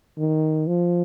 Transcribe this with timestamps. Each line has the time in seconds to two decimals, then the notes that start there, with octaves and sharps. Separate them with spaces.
0.18 D#3
0.67 F3